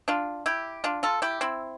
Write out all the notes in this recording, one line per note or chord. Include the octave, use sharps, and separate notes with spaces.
D4 F4
E4 G4
D4 F4
F4 A4
E4 G4
C4 E4